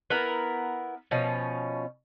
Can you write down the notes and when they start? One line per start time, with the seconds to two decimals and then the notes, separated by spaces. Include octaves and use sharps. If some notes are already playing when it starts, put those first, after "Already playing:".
0.10 B3 E4 A#4
1.11 B2 F3 C#4